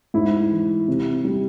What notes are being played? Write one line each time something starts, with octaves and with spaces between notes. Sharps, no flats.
G#2 E4
E3
C3
G3